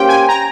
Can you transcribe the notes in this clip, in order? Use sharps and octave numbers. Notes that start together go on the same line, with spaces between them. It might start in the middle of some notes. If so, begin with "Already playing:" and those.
Already playing: A#3 C#4 G4 C5 G5
G#5
A#5